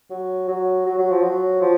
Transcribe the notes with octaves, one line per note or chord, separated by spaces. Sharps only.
F#3
F#3
F#3
F#3
F3
F#3
F3